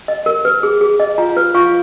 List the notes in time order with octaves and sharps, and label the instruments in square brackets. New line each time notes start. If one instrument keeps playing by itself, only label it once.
[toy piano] D#5
A#4
B4
G#4
G#4
D#5
[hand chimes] F4 F5 [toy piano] A#5
[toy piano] B4
[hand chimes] F4 F5 [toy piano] C#6